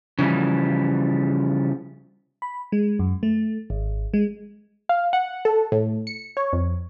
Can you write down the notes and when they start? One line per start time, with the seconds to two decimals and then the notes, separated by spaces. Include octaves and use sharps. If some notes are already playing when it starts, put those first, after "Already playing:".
0.19 C#3 E3 F3 G3
2.42 B5
2.72 G#3
2.99 F#2
3.23 A3
3.70 G#1
4.14 G#3
4.89 F5
5.13 F#5
5.45 A4
5.72 A2
6.07 C#7
6.37 C#5
6.53 F2